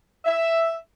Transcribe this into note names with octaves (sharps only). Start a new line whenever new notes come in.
E5